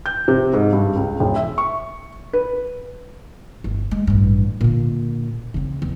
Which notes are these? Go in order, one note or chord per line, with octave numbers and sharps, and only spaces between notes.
G6
C3
G#2
G2
C#2
E1
E5
C#6
B4
G1
G#3
A1 G2
A#2 D3
C#3 C4
E2